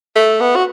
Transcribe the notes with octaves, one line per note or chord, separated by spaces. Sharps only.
A3
B3
F#4